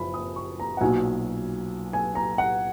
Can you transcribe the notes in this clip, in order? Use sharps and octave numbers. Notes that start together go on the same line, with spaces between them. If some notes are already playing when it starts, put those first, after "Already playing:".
Already playing: F#1 F#2 F3 A#3 B5
D#6
C#6
A#5
F#5
B1 A#2 F#3 G#5
G#5
A#5
F#5